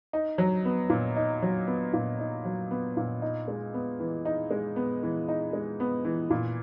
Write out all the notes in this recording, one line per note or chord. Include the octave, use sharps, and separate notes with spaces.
D#4
F#3
B3
A#2
D#4
F#3
B3
A#2
D#4
F#3
B3
A#2
D#4
G#3
B3
E3
D#4
G#3
B3
E3
D#4
G#3
B3
E3
A#2